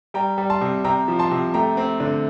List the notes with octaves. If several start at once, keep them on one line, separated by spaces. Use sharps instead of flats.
G3 G5 A#5
G3
A5 C6
C3
C3 G5 A#5
F3
A5 C6
C3
A3 G5 A#5
C4
D3